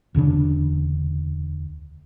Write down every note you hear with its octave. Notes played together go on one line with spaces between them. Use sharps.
E1 D2 C#3 D4